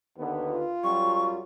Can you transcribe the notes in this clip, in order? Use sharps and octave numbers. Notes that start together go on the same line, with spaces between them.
D#2 D3 B3
F4
F#2 F#3 G3 C#6